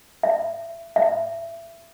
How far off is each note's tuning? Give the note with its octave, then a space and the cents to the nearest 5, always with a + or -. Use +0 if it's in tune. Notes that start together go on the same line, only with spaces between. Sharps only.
E5 +25
E5 +25